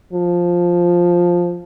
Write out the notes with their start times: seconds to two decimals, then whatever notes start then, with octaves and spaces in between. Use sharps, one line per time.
0.13 F3